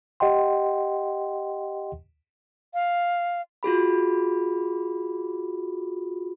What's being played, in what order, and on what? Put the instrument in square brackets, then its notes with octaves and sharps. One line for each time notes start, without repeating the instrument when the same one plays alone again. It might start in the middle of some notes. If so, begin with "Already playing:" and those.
[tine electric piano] G4 D#5 F#5 G5 C6
[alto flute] F5
[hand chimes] F4 F#4 G#4 B5